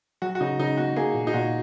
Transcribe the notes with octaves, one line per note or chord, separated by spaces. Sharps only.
F#3 F#4
F#4
C#3 D#4
C#3 D#4
A#3 F#4
A#3 G#4
A#2
D#4
A#2 F#4